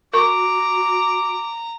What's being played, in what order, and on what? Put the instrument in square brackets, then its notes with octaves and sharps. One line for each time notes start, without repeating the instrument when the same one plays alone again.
[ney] F#4 [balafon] A#4 C#6 [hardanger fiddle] A#5 [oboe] D6